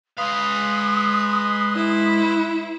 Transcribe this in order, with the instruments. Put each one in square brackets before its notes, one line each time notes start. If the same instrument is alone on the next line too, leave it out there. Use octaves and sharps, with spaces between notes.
[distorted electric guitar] G#3 F5 [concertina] B4 B5 C6 [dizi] D#6
[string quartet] E4